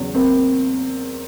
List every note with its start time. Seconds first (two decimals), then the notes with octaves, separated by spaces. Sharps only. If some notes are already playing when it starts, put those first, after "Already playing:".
Already playing: E2 C#3 F#3
0.14 A#3 C4